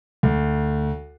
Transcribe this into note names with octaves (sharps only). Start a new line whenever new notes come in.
D2